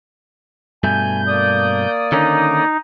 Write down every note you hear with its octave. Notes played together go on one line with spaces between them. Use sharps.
G2 B2 A3 G#5 G6
A#3 D5 D#6
D3 D#3 C#4 D#4